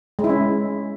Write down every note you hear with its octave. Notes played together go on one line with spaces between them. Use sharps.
G#3
E4
C#4